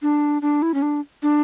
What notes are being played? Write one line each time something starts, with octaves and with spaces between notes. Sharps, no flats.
D4
D4
E4
C#4
D4
D4